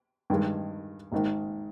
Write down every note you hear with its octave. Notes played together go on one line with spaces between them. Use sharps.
G2 D#3 G#3
G#1 G#2 D#3